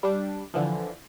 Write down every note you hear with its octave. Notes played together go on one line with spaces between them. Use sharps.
G3 D4
D3 E3 F3